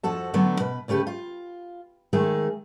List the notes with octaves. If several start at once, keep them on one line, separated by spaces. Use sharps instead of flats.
F2 F3 F#4 A4 A5
D3 F#3 A3 B3 D4
B2 B4
D2 C#3 A3 G4 B4
F4
D#3 G#3 A3 G#4